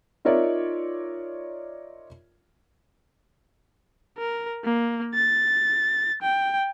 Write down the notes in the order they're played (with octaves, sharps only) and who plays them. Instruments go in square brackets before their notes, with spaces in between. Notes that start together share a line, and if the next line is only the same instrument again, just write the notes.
[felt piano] D#4 F4 A#4 C#5 D5 E5
[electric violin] A#4
A#3
A6
G5